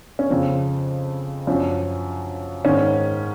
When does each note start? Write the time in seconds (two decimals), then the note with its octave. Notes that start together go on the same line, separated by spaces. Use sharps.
0.19 C#4
0.30 F2 C#3 F3 C4
1.47 F#2 F3 C#4
2.65 G#2 D#3 C#4